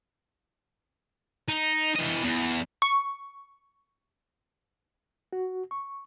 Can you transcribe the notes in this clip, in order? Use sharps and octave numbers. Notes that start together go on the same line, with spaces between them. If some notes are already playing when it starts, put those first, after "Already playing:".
D#4
E3 D#5
E2
C#6
F#4
C#6